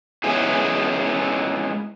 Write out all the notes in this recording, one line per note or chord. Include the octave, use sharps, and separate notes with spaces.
G#3 B3 C#4 E4 G#4